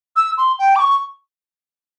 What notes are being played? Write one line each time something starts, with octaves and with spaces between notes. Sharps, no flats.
E6
C6
G5
D6
C#6